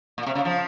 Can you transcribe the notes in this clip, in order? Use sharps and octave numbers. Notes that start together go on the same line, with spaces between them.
A#2
C3
C#3
F3